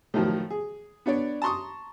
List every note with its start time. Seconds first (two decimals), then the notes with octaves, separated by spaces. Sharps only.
0.14 A2 D#3 F3 F#3
0.50 G#4
1.06 B3 D4 C#5 D5
1.42 A5 A#5 C6 C#6 D#6